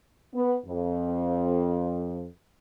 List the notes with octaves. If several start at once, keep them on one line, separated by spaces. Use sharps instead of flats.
B3
F2